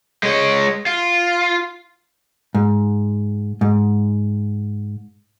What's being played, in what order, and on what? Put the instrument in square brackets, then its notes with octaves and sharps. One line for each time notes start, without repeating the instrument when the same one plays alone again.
[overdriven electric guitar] G#3 C#5
F4
[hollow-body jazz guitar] G#2
G#2